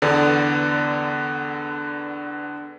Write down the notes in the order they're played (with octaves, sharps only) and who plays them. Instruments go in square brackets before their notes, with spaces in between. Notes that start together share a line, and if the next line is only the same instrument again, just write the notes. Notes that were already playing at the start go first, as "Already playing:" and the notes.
[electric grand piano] E2 D3 B3 D5